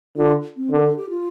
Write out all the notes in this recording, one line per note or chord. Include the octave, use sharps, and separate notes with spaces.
D3 F4
C4
D3
A#4
A4
G4
F4